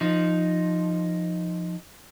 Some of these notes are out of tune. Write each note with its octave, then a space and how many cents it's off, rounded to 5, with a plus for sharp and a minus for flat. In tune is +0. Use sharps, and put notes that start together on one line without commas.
F3 +0 D#4 +0